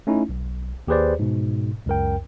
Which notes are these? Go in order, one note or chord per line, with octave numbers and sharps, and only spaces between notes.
A3 C#4 D#4 E4
B1
D#2 G4 G#4 B4 C5 D5
G#2 B2
C#2 F#2 A#4 G5